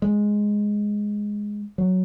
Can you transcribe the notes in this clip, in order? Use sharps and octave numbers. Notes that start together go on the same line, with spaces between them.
G#3
F#3